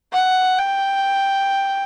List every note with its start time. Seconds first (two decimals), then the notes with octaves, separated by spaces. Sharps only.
0.13 F#5
0.58 G5